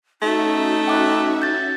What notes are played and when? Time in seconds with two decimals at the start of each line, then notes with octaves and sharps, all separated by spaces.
0.22 A3 C#4 D#4 F#4 E5
0.88 G5 D6 F#6
1.42 G6 A6